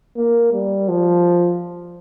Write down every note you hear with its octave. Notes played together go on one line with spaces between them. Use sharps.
A#3
G3
F3